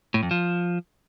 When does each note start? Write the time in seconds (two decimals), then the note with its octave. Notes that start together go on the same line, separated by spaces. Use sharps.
0.14 A2
0.23 F2
0.31 F3